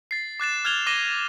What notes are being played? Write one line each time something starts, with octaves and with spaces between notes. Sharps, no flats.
A6 C7
D6 F#6 A6 E7
F6 F#6 G#6 F7 G7
D6 A#6 D#7 E7 G7